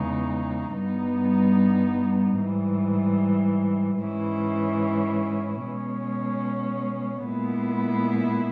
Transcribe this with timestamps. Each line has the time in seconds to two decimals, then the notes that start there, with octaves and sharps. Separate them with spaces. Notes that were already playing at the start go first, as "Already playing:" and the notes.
Already playing: E2 C#3 G#3 D#4
0.77 G2 G3 B3 D#4
2.39 G#2 E3 G3
4.01 G#2 E3 G#3 C#4 E4
5.63 B2 G#3 C#4
7.26 A#2 G#3 B3 E4